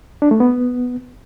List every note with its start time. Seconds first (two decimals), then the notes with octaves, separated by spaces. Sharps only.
0.22 D4
0.31 A3
0.40 B3